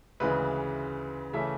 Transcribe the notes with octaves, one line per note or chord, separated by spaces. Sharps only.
D2 C#3 E3 G#3 B4
C#3 E3 A3 C#4 E5